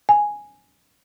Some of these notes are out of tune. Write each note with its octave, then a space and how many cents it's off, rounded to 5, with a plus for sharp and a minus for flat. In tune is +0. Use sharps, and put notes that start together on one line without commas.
G#5 +0